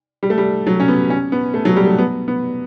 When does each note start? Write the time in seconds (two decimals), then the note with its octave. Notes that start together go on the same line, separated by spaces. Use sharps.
0.23 G3
0.30 A3
0.38 G3
0.67 F#3
0.80 C#4
0.88 B3
1.10 C#4
1.32 B3
1.54 A3
1.65 F#3
1.76 G3
1.87 A3
1.99 B3
2.28 B3